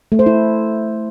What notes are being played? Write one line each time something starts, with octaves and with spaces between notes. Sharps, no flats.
A3
C5
E4